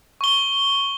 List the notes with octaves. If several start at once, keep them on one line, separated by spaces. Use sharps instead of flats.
C#6 G7